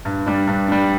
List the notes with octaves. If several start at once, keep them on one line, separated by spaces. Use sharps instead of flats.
G2
G3 D4
G2
G3 D4